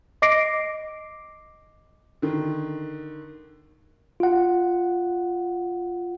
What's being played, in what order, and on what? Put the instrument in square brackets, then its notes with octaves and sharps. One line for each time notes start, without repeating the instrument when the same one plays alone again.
[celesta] D#5 D6 A#6 C7 D7
[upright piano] D3 D#3
[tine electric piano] F4 F#5